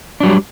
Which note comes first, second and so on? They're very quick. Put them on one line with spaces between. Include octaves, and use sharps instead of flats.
D4 F#3 G3